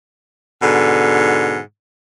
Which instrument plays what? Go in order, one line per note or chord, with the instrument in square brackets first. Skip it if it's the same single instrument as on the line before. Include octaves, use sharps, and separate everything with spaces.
[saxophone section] G#2 B2 D3